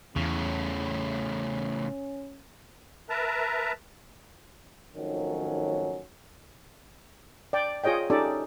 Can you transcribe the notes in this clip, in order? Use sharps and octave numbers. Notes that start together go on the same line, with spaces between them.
E2 A2 C#3 C#4
A#4 B4 E5 A5 A#5
G#1 D#3 F3 F#3 A3 C#4
D5 G5
F4 G#4 C#5 D#5 G5
C#4 D#4 G4 A4 D5